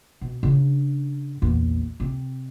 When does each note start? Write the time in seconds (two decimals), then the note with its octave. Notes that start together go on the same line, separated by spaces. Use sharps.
0.21 B2
0.43 C#3 D4
1.42 A#1 E2
2.00 C3